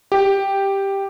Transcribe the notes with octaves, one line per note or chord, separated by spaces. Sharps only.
G4